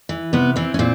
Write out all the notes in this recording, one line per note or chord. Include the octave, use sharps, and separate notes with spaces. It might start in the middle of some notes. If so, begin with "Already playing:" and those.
E3
C3 B3
E3 C4
C#4
A#2 C4